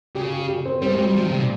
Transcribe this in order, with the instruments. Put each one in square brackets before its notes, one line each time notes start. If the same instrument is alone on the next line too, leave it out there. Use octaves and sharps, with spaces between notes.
[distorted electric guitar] C#3 [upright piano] G4
[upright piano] G4
G4
C4
[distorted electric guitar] G3 [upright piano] C4
[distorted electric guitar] G#3
[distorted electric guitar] G3 [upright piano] G4
[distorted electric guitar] F3 [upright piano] G4
[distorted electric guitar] D#3
[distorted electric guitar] C3 [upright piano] G3
[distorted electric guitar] A#2